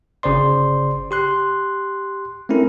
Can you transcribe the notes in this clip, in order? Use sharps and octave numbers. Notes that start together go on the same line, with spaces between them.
G1 C#3 C5 D5 C6
G4 C6 F#6
A3 C4 C#4 E4 A#4